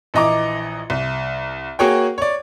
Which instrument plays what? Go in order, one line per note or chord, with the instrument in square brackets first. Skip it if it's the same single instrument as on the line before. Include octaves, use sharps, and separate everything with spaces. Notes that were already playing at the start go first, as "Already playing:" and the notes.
[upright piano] A#1 E3 D#5 A#5 D6
C2
A#3 F#4 G#4 C#5 G5
C#5 D5